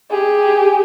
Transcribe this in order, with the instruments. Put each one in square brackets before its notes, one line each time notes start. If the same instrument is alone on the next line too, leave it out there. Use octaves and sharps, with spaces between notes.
[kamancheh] G4 G#4